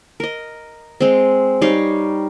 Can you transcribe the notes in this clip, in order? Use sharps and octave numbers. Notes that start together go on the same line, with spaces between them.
A#4 D#5
G#3 C4
G3 D#4 C#5 F5